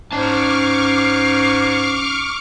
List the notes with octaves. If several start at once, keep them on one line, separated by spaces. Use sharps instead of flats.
G#2 C#4 A5 C#6 D6 F6 C7